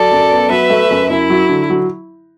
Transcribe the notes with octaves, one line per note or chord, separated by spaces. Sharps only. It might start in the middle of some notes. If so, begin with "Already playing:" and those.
Already playing: F#3 A4 D5
F#2
B3
F#3 B4 E5
A3
F#2
F#2 E4
F#3
D3
F#3